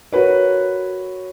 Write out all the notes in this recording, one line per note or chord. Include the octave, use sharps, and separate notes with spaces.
F#4 A#4 B4 C#5